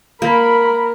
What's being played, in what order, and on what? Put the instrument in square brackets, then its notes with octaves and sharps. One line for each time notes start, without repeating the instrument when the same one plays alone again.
[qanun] A#3 [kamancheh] A#4 [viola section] B5